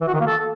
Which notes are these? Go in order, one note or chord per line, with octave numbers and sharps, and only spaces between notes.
E3
F#4
D#3
A#3
A4